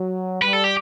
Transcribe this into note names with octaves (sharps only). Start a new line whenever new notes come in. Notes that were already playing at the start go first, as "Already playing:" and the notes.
Already playing: F#3
G3 B4
A4
G4